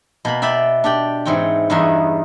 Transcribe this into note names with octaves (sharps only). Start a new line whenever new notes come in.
B2 A#3 B5
D5 E5 G5 B5
D4 G4 D5 G5
G#2 E3 C4 C#5 G5
E2 G2 B3 D#4 E5 G#5